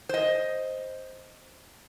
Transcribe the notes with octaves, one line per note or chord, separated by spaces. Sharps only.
C5 D#5